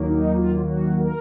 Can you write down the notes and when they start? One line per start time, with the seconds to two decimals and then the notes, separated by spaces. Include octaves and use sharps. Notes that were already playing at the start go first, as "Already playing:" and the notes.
Already playing: D#2 D#3 F#3 A#3
0.09 D#4
0.35 F4
0.56 F4
0.61 F#4
1.00 A#4